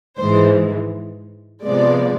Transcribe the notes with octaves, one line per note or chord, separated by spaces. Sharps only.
G#2 E3 G#3 C5
C3 F3 G#3 B3 D5